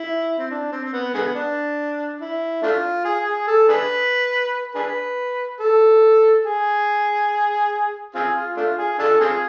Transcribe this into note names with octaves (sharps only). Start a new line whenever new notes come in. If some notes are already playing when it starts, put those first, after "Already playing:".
Already playing: E4
C4
D4
C4
C4
B3
D3 G#3 B3
D4
E4
A3 D4 F4
G#4
G#4
A4
D4 G#4 B4
D4 G#4 B4
A4
G#4
C4 F4 G#4
F4
A3 D4 F4
G#4
D4 F4 A4
C4 F4 G#4